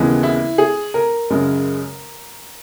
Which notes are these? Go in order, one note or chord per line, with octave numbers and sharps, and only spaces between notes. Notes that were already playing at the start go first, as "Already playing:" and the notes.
Already playing: D#2 C#3 E3 G#3 B3
E4
G#4
A#4
F#2 C#3 G#3